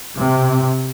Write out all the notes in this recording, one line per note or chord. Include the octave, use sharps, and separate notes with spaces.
C3